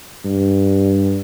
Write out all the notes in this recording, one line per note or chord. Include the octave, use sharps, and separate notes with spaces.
G2